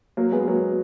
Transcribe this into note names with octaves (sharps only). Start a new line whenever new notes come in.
F#3 A#3
G#3 B3
F#3 A#3